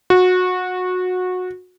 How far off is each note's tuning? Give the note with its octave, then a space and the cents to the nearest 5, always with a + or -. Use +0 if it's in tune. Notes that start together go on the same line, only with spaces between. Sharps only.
F#4 -20